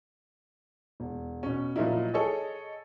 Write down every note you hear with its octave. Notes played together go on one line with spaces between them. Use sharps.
E1
B2 C#4
A#2 F3 F#3 D#4 E4
G#4 A4 C#5 D#5